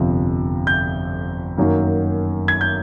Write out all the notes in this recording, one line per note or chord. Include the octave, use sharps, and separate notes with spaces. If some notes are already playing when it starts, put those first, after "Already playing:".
Already playing: G1 F2 C3 F3
G6
F#2 D#3 F#3 A#3
G#6
G6